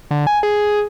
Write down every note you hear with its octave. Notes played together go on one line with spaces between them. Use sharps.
D3
G#5
G#4